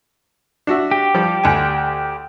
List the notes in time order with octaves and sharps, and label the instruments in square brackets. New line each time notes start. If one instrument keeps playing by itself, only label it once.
[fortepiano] D4 F#4 E5
[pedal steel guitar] G4
[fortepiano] F3 G3
D2 G#5